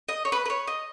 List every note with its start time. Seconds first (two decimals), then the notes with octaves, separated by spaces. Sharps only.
0.09 D#5
0.25 C#5
0.32 B4
0.45 B4
0.50 C#5
0.68 D#5